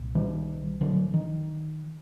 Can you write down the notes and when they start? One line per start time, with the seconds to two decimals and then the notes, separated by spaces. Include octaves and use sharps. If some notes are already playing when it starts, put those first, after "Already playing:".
Already playing: C2 A#2
0.15 D#3 G3
0.81 D3 F#3
1.14 D#3